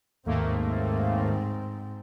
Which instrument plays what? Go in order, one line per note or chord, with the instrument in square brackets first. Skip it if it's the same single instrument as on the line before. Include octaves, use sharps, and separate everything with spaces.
[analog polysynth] D#2 A3 A#3 [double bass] G#2 C4